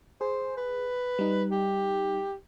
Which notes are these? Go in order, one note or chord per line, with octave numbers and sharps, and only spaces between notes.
G#4 C5
B4
G3 D#4
G4